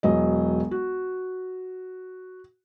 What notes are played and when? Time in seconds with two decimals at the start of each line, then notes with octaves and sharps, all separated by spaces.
0.03 E1 F#3 D#5
0.71 F#4